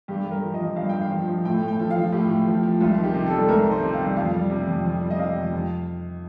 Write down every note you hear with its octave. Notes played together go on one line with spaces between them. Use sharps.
G2 G4
G2
A#4
F3
D#5
F3
G2 F5
G2 G5
F5
F3
F3
A2 G5
A2
G5
F3
F5
F3
A2 G4
A2
F3
F3
C2 F4
D#3
G4
C3
G3 A4
C2 A#4
D#3
C5
C3
F5
G3
F2 F5
G3
C3
F2
F2
G3
D#5
C3 F5
F2
F2